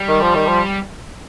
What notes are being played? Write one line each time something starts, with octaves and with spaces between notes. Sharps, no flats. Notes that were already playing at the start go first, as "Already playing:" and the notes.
Already playing: G3
D#3
F3
D#3
F3